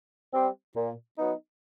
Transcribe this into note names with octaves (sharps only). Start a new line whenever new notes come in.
G3 C4
A#2
F#3 B3 D#4